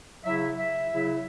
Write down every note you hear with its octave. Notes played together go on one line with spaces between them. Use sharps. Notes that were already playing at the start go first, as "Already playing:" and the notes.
C#3 F#3 E4 E5
E5
C#3 F#3 E4